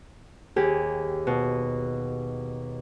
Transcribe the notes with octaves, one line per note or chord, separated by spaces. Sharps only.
D#2 G4 G#4
B2